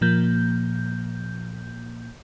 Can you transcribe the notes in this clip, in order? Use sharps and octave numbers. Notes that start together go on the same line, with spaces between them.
A#2 F3 A#3 G6